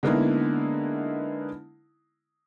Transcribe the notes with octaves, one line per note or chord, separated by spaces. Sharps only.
D3 G#3 A#3 B3 D#4 E4